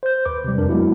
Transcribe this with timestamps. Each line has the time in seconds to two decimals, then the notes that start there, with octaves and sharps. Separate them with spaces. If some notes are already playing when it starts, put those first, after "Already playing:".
0.03 C5 G6
0.25 D#2 B4 D6
0.44 C3 G3
0.57 F2 D4 A#4
0.69 F#3 G#3 A#3 B3 E4 F#4